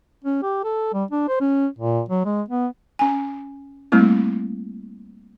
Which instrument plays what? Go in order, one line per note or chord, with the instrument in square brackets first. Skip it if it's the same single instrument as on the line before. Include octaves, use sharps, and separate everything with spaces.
[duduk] C#4
G4
A4
G3
D4
C5
C#4
A#2
F#3
G#3
B3
[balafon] C#4 G#5
G3 A3 A#3 C4 E4